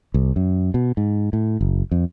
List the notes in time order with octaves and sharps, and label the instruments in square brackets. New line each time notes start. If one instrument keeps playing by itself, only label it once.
[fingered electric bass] C2
F#2
B2
G#2
A2
F#1
F2